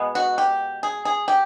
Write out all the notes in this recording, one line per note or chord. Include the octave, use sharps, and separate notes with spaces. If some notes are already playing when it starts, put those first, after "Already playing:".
Already playing: B2 G#3 B3
F#4
G4
G#4
G#4
G4